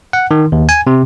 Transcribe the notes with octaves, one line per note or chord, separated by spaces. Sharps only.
F#5
D#3
D#2
G#5
C3